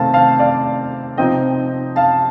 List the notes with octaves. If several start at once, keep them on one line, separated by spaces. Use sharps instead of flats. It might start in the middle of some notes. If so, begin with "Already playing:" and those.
Already playing: C3 D#3 A3 C4 F5 A5
F5 A5
D5 F5
C3 F3 C4 D#4 D#5 G5
F5 A5